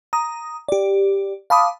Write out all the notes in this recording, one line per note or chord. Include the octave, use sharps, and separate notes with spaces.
A#5 D#6
G4 D5
F5 A5 B5 D6 D#6